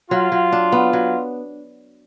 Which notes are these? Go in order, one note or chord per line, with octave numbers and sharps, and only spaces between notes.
F#3 F4
F#3
D4
B3
F#3